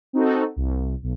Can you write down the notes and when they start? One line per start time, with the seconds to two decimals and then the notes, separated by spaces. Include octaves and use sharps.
0.13 C4 D#4 F#4 A4
0.56 C2
1.03 B1